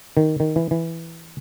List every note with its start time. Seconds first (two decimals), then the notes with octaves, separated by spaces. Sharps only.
0.17 D#3
0.40 D#3
0.56 E3
0.71 E3